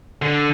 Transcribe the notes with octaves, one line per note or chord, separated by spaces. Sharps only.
D3